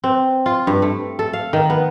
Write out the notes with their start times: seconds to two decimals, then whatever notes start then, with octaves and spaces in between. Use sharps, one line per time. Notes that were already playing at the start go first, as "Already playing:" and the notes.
0.04 C4
0.46 F4
0.67 G2
0.82 A3
1.19 A4
1.33 F5
1.53 D#3
1.70 B3